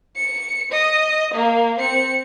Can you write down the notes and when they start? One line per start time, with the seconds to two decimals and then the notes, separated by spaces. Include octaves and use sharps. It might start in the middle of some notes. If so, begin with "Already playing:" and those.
0.17 C#7
0.72 D#5
1.34 A#3
1.79 C4 C#7